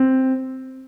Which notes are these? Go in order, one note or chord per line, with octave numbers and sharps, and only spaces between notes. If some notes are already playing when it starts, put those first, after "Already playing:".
Already playing: C4